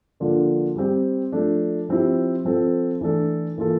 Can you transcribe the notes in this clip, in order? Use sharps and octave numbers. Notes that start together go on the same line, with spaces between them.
D3 F3 A#3 D4 F4
G3 C4 G4
F3 A3 D4
F3 C4 E4 G4
F3 C4 F4 A4
E3 A3 D4 A4
E3 A#3 F4 A4